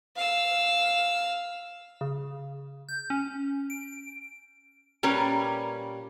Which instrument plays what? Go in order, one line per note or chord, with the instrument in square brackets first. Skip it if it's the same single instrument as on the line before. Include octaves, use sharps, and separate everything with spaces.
[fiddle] F5 E6
[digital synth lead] C#3
G6
C#4
D7
[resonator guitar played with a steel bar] A#2 G3 C#4 A#4 B4